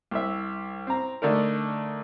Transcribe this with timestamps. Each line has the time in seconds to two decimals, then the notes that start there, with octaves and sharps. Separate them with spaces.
0.11 C2 E5
0.87 C4 A#5
1.22 D3 A3 D4 D#4 A#4